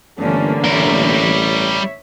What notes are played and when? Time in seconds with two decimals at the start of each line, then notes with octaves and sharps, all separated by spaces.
0.19 G1 D3 E3 A3 A#3 C#4
0.65 A1 G3 A#4 C#5 E5